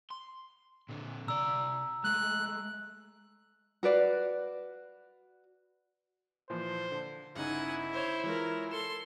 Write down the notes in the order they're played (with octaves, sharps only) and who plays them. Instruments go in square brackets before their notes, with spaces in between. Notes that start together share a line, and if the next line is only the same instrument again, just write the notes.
[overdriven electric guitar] C6
A#2 D3
[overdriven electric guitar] C3 D5 [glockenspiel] A#5 E6
[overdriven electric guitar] G#3 A3 [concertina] F#6
[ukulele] F#4 B4 D5 F5
[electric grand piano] A#2 E3 F3 [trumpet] C5
[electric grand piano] D3
[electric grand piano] G1 C#3 D#4 [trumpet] E4 [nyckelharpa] F#5 G#5
[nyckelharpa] C5 C#5
[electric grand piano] E3 G#3 F4 [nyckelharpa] A#4 C#5
[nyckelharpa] A4 C6 [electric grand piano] C#7 E7